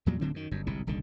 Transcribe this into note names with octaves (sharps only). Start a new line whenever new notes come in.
E2 A#2 F#3 G3
D1 D3 F#3 C4
F#2 D#3
G1 F#2
G1 C2 G#2 C3
D#1 C2 D3 D#3